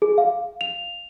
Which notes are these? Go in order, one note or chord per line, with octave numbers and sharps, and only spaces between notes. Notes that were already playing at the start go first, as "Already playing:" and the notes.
G#4
F5
F7